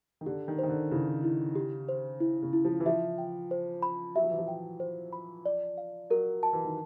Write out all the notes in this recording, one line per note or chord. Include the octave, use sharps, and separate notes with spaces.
D#3
D3 G4
D#3
D#3 C5
D3
C#3 E4
E4
G4
C5
E4
C#3
E4
F3
E3
F3 E5
G5
C5
B5
F#3 E5
F3
E3
F3
G5
C5
B5
D5
F5
F#3 A#4
A5
E3
D#3